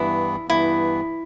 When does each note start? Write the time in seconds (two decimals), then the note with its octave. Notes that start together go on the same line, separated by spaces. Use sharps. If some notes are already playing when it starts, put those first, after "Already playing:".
Already playing: G2 E3 B3 E4
0.48 G2 E3 B3 E4